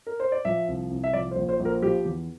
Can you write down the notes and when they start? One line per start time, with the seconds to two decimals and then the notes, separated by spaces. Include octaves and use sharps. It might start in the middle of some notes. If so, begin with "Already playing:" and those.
0.07 A#4
0.20 C5
0.32 D5
0.45 F3 E5
0.68 C2
0.91 C2
1.04 E5
1.13 F3 D5
1.31 C5
1.36 A#1
1.49 C5
1.60 A#1
1.65 A#4
1.82 F3 G4
2.05 E2